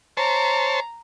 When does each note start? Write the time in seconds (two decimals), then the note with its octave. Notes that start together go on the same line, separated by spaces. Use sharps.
0.17 C5 C#5 A5 A#5